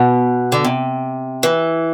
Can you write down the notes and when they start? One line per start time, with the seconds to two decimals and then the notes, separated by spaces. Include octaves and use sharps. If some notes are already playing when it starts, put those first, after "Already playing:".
Already playing: B2
0.52 D3
0.65 C3
1.43 E3